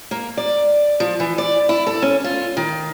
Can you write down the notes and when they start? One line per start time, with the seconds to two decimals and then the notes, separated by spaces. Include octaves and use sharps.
0.11 A#3
0.37 D5
1.00 F3
1.20 E3
1.38 D5
1.69 E4
1.87 A4
2.02 C#4
2.24 F4
2.57 D#3